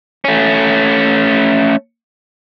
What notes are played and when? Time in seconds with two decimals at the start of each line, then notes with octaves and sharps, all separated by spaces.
0.25 A3 C#4